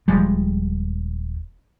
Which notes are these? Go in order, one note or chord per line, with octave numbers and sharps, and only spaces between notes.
D#1 F3 G3 G#3